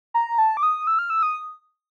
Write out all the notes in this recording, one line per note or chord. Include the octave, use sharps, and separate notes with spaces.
A#5
A5
D6
D#6
E6
F6
E6
D#6